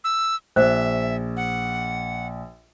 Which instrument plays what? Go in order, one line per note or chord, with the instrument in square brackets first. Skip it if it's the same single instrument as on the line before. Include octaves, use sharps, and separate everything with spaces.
[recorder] E6
[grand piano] A#1 [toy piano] C5 [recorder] E5
[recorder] F#5